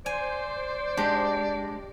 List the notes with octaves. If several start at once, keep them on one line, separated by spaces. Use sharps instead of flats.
C5 D5 G#5
G#3 D4 G4